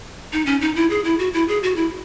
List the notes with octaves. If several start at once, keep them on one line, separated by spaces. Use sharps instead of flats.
D#4
C#4
D#4
E4
G#4
E4
F#4
E4
G#4
F#4
E4